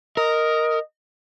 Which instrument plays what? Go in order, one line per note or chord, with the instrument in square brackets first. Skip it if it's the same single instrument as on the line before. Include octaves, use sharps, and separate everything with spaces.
[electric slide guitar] A#4 [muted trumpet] D#5